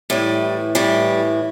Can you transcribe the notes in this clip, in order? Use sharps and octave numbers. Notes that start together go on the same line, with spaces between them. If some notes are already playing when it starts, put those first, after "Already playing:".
A2 E3 G3
A2 E3 G3